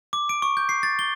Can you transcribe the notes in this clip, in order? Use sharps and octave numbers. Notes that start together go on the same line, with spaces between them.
D6
D7
C#6
G6
C7
A6
G7